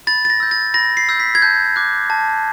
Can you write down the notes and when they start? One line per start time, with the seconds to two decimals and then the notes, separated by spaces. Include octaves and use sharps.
0.07 B5 A6
0.25 A6
0.30 A#6
0.40 E6 G6
0.51 A6
0.74 B5 A#6
0.97 C7
1.09 E6 G6
1.20 B6
1.35 G#6
1.42 A5 G6
1.76 D6 F#6
2.10 A5